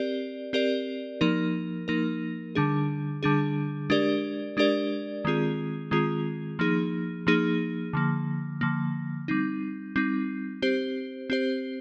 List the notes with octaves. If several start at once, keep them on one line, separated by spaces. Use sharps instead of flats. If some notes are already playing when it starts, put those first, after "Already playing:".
Already playing: C4 G4 A#4 D5
C4 G4 A#4 D5
F3 A#3 D#4 A#4
F3 A#3 D#4 A#4
D3 G3 D4 G#4
D3 G3 D4 G#4
G#3 D4 G4 A#4 D5
G#3 D4 G4 A#4 D5
D#3 G#3 C4 F4 G#4
D#3 G#3 C4 F4 G#4
F3 A#3 D#4 G#4
F3 A#3 D#4 G#4
D3 F3 A#3
D3 F3 A#3
G3 C4 D#4
G3 C4 D#4
C4 G4 C5
C4 G4 C5